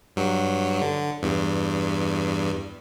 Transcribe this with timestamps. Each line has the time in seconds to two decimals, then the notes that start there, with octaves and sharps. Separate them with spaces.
0.16 G2 F#3
0.82 D3
1.23 E2 G2